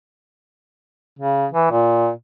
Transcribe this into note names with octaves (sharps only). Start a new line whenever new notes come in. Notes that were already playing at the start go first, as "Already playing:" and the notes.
C#3
E3
A#2